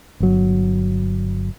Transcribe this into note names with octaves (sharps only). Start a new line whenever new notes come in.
G1 F#3